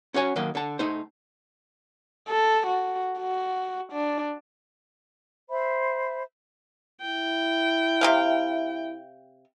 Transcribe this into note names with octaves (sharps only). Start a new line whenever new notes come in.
C#4 F#4 C#5 G#5
D#3 F#3 A#3 D#5
D3 A5
A3 D#4 C5
A4
F#4
F#4
D4
C5 E5 B5
E4 G5
C3 C#4 F5